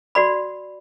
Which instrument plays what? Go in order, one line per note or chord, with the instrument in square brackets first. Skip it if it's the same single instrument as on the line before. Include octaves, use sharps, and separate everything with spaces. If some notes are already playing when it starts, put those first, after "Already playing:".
[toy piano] F#4 D5 B5